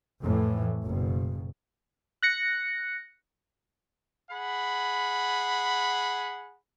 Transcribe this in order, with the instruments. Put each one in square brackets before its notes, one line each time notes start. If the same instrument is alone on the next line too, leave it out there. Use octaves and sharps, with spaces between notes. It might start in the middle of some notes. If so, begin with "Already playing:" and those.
[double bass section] F2 A2 E3
F#1 B2
[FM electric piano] F#6 A#6 C#7
[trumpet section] G#4 F#5 B5